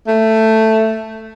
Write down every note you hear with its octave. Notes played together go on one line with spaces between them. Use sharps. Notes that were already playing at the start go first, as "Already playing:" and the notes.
A3